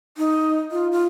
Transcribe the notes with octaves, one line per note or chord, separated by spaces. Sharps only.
D#4
F4
F4